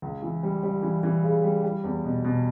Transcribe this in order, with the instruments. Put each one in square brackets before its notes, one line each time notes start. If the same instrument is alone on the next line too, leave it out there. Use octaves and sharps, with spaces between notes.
[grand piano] C#2
E3
G3
G3
E3
E3
C#3
G3
G3
E2
B2
B2